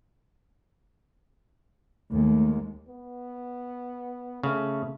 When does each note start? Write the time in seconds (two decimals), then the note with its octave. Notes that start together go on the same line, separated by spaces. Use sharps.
2.11 D#2 G#3 A3
2.88 B3
4.43 C#3 A3